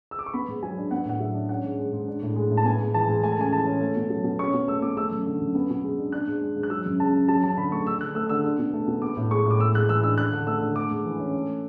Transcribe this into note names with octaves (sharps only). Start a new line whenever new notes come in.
E6
D6
C#6
B3 B5
G#2
F#3 G#5
D4
B3 F#5
A2 F#5
F#3 E5
D4
C#4 F#5
G#2
G#3
G#2
D4
A2
G#3
A2
A5
B3 G#5
G#2
E3 A5
G#2
A3 G#5
A5
C#3 G#5
E3 A5
C#4
A3
B2
F#3
B2
C#4 C#6
B2
A3 E6
B2 D6
A3 E6
F#2
D3
F#2
B3
B2
G#3
D4
D4 F#6
G#2
G#3
G#2
F#6
F#3 E6
F#2
C#3 A5
F#2
F#3 A5
F#2 A5
D3 B5
A3 C#6
D4 E6
D3 F#6
A3 E6
D3 E6
D4
B2
A3
B2
B3 D6
A2
G#3 C#6
A2 D6
G#3 E6
G#2 F#6
E3 E6
D4 E6
D4 F#6
D3
A3 E6
D3
A3 D6
G#2
E3
C#4
A3